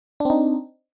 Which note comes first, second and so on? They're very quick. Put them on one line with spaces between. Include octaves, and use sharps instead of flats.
D4 C4 D#4